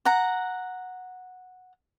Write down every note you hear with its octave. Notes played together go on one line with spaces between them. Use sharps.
F#5 A#5